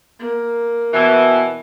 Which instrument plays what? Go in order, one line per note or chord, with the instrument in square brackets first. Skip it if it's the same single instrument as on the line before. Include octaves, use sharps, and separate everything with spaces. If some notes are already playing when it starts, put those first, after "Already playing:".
[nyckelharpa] A#3
[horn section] B2 E3